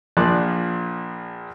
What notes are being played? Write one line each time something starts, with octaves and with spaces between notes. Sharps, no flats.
A#1 A#2 F3 A#3 D5 F#6